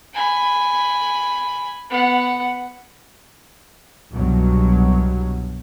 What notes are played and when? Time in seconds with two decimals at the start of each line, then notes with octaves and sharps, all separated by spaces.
0.14 G#5 B5
1.90 B3 F#5
4.12 C2 G2 B2 F#3